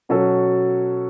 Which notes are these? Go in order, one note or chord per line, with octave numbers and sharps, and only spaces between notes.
B2 F#3 C#4 F#4 A4